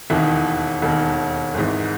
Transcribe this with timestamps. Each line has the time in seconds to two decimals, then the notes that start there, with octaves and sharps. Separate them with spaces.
0.10 E1 D#2 D#3 E3 E4
0.82 E1 D#2 D#3
1.54 G#1 G#2 E3